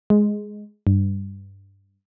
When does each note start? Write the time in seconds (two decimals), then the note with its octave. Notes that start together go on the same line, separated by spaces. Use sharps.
0.10 G#3
0.87 G2